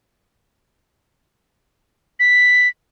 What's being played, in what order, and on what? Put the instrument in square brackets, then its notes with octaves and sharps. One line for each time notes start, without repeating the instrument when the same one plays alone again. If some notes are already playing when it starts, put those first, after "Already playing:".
[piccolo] B6